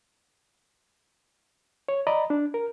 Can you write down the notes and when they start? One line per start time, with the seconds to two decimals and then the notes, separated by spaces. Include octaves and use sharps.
1.89 C#5
2.07 D5 D#5 A#5 B5
2.30 D4
2.54 A#4